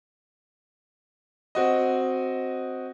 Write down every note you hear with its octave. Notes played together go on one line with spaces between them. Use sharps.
C4 F#4 D#5